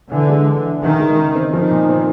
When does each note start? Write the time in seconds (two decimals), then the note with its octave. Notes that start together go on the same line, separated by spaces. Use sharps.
0.12 D3 E3
0.29 G#3
0.47 E3
0.65 E3
0.82 D#3 E3
1.00 G#3
1.18 C#3
1.35 C4
1.53 D#3 F3
1.71 A#2
1.89 C4